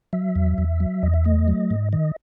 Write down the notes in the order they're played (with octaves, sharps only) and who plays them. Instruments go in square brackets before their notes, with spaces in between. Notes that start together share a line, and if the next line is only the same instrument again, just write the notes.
[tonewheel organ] F#3 E5
E2
E2
F#3
E2 D#5
E5
A3 D#5
F#3
G#2
D#3 D#5